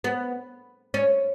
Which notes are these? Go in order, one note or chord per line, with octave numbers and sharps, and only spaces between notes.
B3
C#4